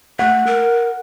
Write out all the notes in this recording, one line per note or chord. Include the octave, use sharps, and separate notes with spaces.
A3 F#5
A#4